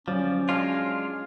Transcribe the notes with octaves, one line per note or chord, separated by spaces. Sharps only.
F3 F#3 C#4 D5
G#3 D4 F4 F5